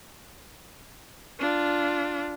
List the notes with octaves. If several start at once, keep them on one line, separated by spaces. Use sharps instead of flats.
D4 F4